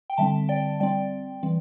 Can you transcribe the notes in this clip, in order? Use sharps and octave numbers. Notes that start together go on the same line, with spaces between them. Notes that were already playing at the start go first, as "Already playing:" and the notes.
G5
D3 G3 C4 E5 A5
D5 G5
G3 C4 D5 G5
E3 G3 C4